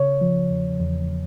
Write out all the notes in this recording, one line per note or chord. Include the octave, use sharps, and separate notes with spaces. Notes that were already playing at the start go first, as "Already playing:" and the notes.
Already playing: C#3 C#5
F3
E2
E2